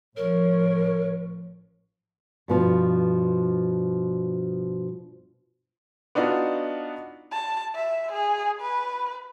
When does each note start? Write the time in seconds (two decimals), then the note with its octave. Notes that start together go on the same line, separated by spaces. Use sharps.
0.17 A1 F3 A#4 C#5
2.48 G2 B2 F3
6.15 B3 D4 D#4 F4 F#4
7.32 A5
7.75 E5
8.12 G#4
8.61 B4